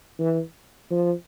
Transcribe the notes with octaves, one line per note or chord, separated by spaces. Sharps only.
E3
F3